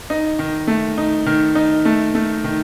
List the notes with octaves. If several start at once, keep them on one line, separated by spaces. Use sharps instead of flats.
D#4
D#3
A3
D#4
D#3
D#4
A3
A3
D#3